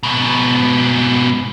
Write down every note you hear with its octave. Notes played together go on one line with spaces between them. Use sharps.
G#2 B2